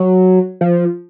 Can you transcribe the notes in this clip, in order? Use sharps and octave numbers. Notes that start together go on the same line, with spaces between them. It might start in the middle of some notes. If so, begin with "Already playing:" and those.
Already playing: F#3
F3